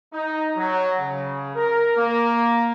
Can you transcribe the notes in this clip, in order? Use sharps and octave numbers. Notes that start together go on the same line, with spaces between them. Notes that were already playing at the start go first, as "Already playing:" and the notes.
D#4
F#3
C#3
A#4
A#3